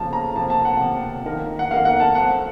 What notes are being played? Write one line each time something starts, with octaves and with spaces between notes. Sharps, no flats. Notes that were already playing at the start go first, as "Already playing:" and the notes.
Already playing: F2 C#3 F3 A#3 A5
A#5
C3 F3 A#3 A5
A5
F#5
C3 F3 A#3
D#3 A#3 F4 A#4
F#5
D#3 A#3 F4 A#4 F5
F#5
A5
F3 A3 C4 F4 F#5